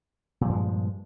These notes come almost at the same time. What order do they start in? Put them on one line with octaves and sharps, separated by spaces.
A#2 F3 G2 G#3